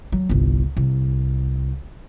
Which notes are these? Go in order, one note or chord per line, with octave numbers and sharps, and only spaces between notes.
F#3
G1 C2
C2